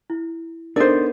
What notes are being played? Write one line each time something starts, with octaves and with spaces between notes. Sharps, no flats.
E4
B3 D4 D#4 A4 A#4 C5 D5